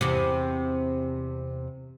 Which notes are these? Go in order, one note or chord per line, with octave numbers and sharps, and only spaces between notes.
E2 C3